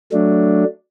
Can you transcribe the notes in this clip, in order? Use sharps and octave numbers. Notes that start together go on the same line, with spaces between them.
F#3 A3 D4